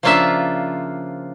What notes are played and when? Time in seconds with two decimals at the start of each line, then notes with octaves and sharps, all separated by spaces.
0.03 C#3 F3 A#3 D4 F4 E5